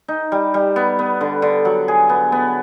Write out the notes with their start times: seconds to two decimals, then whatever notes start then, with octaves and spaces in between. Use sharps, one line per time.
0.08 D#4
0.32 G3
0.54 G3
0.76 B3
0.99 B3
1.21 D3
1.42 D3
1.65 F#3
1.88 G#4
2.09 B3
2.32 B3